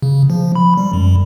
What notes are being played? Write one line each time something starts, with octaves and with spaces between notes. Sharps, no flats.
C#3
F3
B5
G3
F#2